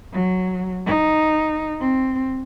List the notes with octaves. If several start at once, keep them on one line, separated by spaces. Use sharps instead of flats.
F#3
D#4
C4